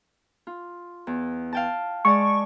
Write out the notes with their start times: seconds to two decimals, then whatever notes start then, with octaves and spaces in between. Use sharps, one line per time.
0.47 F4
1.07 E2
1.53 F5 G5 A5
2.05 G#3 D5 A5 C#6